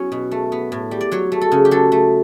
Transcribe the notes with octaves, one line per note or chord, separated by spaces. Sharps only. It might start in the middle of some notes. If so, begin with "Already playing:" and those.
Already playing: F#3 B3 C#4 E4 C#5
B2
A3
B3
A2
G3
D5
F#3 C#5
A3
A4
C#3
G4
F#3 A4
A3